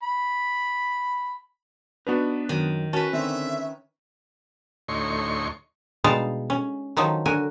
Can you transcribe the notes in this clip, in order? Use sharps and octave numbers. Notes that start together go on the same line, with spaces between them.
B5
B3 D4 D#4 F#4 B4
F#2 D#3
C#4 F#4 A#4 B4 A5
D3 D#3 C4 E5
D2 A2 D#4 C#5 C6 C#6
B2 G3 G#3 D#4 F5 A5
C#4
D#3 F3 F#3 D#4
D3 F#4 A#4 G#5